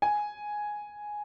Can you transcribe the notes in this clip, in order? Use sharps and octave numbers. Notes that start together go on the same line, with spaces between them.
G#5